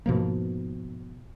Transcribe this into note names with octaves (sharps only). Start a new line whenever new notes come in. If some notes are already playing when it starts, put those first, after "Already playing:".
G#2 B2 F3 A#3